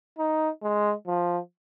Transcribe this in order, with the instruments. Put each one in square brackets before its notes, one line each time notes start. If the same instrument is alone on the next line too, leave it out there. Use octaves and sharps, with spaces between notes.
[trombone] D#4
G#3
F3